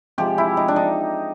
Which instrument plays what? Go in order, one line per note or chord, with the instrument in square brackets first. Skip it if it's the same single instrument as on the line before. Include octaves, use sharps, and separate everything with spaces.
[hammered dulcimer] C3 F3 G#3 G4
E4
D#4
D4
D#4